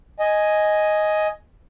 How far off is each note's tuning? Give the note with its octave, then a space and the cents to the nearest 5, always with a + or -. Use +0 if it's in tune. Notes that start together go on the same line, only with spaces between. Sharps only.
D#5 +5 G#5 +5